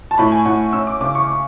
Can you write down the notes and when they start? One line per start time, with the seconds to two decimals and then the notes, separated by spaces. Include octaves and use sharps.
0.11 A5
0.18 A2 B5
0.32 G#5
0.45 A2 F#5
0.73 C#4 E6
0.87 D6
1.01 C#3 D6
1.15 C#6